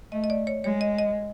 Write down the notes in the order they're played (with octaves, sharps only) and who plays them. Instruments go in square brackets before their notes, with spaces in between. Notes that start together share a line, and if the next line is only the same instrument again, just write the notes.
[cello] A3 [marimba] D#5
[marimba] D#5
D5
C#5
[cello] G#3 [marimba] C#5
[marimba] D#5
D#5